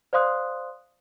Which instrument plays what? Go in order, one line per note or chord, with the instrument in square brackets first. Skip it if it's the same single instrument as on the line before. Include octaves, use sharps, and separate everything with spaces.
[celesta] C5 D5 F5 C6 D#6 F#6